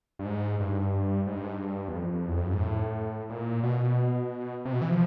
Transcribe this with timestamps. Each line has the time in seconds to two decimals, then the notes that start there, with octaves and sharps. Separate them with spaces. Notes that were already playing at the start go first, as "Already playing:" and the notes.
0.19 G2
0.25 G#2
0.60 G2
1.27 G#2
1.35 G2
1.44 G#2
1.53 G2
1.88 E2
1.95 F2
2.28 E2
2.37 F2
2.46 F#2
2.53 G#2
2.62 A2
3.30 A#2
3.63 B2
4.65 C3
4.73 B2
4.82 E3
4.90 F3